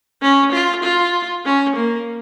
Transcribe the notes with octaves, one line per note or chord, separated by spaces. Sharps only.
C#4
F4
F4
C#4
A#3